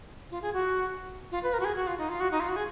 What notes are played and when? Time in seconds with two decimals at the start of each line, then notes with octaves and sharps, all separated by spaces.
0.31 F4
0.42 G#4
0.53 F#4
1.31 F4
1.43 B4
1.53 A#4
1.60 F#4
1.64 G#4
1.76 F#4
1.87 F4
1.98 D#4
2.09 F4
2.20 F#4
2.31 D#4
2.40 F4
2.48 F#4
2.56 G#4